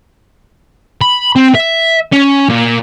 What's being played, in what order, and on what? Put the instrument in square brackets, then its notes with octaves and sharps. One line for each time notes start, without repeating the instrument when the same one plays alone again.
[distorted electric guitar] B5
C4
E5
C#4
A#2